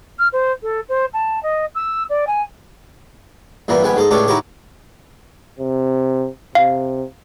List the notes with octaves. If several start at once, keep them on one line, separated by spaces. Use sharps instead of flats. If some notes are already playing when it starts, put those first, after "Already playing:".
F6
C5
A4
C5
A5
D#5
E6
D5
G#5
G2 A#2 E3 A#3 B3
A#1 D3 G3 B3 G#5
G#2 A4 D#5
C#2 A2 D4 G4 A4 C#5
D#4 E4 F#4 G4 C#5
C3
C3 F5